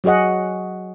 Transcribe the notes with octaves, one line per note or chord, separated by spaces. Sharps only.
F#3 F#4 G#4 D#5 F#5